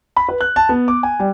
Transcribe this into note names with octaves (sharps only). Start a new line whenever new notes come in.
B5
B4
F#6
A5
B3
D6
G#5
G3